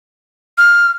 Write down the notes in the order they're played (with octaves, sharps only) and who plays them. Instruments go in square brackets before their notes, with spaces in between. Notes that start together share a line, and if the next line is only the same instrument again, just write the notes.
[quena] F6